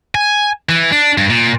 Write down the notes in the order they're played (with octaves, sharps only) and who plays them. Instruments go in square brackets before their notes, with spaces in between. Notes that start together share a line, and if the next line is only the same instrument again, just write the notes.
[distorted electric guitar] G#5
E3
D4
G2
A#2